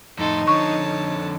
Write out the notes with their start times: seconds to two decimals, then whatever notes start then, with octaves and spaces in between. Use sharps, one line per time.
0.19 F2 A2 D#4 A4 C6
0.47 F2 D3 C#5 A5 C#6